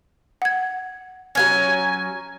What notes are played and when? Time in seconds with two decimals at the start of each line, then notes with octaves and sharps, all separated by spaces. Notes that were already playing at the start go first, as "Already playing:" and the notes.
0.42 F#5 G#6
1.35 F#3 B3 C#4 G#5